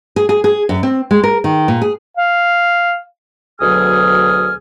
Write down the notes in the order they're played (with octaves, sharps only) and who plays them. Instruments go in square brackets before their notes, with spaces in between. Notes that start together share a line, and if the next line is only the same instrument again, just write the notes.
[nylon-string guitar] G#4
G#4
G#4
F#2
C4
G#3
A#4
D#3
A#2
G#4
[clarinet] F5
[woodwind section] D2 B2 F#3 G#4 D#6 F6